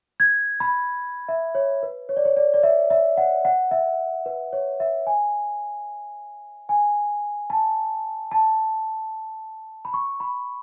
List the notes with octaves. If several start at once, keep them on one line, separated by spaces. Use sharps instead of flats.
G#6
B5
E5
C#5
B4
C#5
D5
C#5
D5
D5
E5
E5
F#5
F#5
E5
B4
C#5
E5
G#5
G#5
A5
A5
B5
C#6
B5